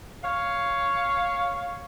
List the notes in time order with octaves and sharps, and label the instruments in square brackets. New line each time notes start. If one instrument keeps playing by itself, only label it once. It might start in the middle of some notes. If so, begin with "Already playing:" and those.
[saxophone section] C#5 F5